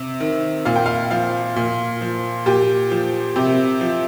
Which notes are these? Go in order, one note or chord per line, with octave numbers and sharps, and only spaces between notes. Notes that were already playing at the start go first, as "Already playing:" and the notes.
Already playing: C3
D#3
A#2 F5
G5
F5
F3 F5
A#2
F3
A#2 G4
F3
C3 G4
F3